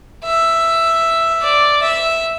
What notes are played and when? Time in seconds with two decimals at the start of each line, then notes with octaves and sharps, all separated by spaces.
0.24 E5
1.42 D5
1.82 E5